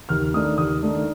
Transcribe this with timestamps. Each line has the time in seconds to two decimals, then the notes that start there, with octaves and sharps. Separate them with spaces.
0.09 D#2 F6
0.34 D#3 A3 D4 D#6
0.58 D#2 D#6
0.82 D#3 A3 D4